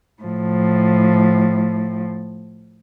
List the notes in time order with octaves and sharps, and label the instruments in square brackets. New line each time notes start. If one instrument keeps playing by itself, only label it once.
[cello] A2 F3